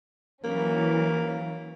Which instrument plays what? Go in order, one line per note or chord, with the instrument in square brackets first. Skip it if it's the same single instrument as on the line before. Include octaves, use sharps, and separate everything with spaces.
[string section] E3 F#3 C#4 [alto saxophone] A#3